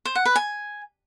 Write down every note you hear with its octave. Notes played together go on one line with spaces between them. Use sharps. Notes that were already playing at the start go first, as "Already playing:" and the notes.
C5
F#5
B4
G#5